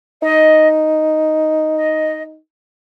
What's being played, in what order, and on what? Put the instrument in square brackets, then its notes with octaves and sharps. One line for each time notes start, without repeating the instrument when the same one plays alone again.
[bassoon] D#4 [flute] D#5
[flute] D#5